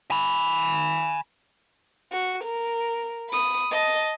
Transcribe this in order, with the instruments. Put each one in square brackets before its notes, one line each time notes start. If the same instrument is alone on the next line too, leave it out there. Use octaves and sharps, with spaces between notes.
[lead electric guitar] G#5 B5
[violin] F#4
A#4
B5 D#6
D#5 A5